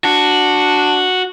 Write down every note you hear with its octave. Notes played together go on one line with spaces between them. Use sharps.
D4 F#4